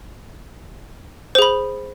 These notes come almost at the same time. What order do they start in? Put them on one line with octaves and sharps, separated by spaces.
C5 G#4 B5